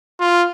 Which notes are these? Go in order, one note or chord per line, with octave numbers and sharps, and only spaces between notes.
F4